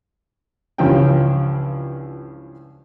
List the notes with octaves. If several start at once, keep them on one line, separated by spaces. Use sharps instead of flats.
C#2 G2 E3 F3 C#4 G5